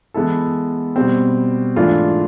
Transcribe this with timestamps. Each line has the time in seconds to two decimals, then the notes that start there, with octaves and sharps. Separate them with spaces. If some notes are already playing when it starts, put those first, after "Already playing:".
0.14 E3 G#3 B3 E4 A4
0.96 B2 G3 C4
1.76 G#2 E3 A3 D4 F4